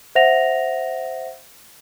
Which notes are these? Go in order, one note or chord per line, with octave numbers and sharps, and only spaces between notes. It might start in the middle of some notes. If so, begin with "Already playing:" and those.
C5 E5 F#5 A#6 F7